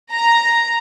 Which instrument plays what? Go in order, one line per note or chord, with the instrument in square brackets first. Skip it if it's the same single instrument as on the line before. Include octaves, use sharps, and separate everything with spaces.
[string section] A#5